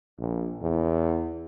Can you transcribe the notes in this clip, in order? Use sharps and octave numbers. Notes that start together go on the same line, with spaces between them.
A#1
E2